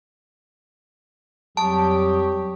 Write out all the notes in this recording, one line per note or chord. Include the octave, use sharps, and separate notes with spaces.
F2 F#3 G3 G4 A5 C#6 D#6